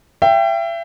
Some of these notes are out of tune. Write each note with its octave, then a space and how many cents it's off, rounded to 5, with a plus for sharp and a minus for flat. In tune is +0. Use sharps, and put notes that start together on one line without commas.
E5 +35 G5 +0